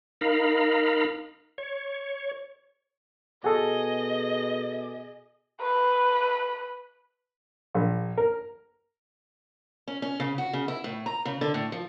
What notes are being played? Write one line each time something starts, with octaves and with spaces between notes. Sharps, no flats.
D#4 A#4 F5 B5
C#5
B2 F#4 G#4 A4 D#5 G#5
B4
A#1
A#4
C#4
C#4
C#3
F#4
C#3
E4
A2
A#5
C#3
D3
A2
F3